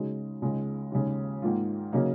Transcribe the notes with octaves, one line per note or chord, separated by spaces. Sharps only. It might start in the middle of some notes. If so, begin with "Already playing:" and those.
Already playing: C#3 G#3 D#4 F#4
C#2 C#3 G#3
D#2 C#3 G#3
G#2 D#3 A#3 F4
C#3 F#3 A#3 D#4